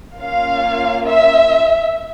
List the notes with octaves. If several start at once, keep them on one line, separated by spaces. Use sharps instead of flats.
A#3 C#4 F4 F5
E5